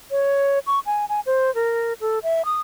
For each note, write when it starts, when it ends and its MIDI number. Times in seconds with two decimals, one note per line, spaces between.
0.11 0.59 73
0.67 0.80 85
0.86 1.05 80
1.09 1.20 80
1.26 1.53 72
1.55 1.93 70
2.01 2.19 69
2.23 2.45 76
2.45 2.61 87